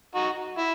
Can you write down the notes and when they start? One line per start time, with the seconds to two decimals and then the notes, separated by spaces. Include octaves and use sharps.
0.15 D#4 F#4
0.59 E4